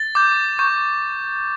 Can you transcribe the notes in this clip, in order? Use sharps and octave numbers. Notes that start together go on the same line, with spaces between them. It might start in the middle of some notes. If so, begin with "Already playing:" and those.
Already playing: A6
D6 G6
C#6 G6